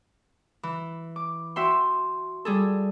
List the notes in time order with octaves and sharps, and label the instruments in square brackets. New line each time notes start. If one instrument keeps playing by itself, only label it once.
[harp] E3
D6
F#4 E5 G5 C6
G3 G#4 A4